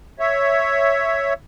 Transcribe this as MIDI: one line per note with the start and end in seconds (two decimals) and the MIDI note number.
0.19 1.33 73
0.19 1.33 76